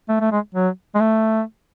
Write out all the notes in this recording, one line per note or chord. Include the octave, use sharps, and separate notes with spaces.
A3
A3
G#3
F#3
G#3
A3